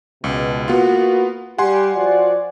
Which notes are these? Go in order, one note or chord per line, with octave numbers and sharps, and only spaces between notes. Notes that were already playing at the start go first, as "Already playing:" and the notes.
C#2 B2
A#3 B3 F4 F#4
G3 G4 F#5 G#5 C6
F3 F#4 D5